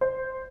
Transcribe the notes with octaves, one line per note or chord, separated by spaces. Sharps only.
C5